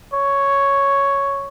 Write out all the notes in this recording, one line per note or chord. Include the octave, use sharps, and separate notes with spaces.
C#5